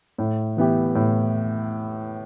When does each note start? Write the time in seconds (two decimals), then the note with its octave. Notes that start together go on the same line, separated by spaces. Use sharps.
0.18 A2
0.57 E3 B3 E4 G4
0.95 A2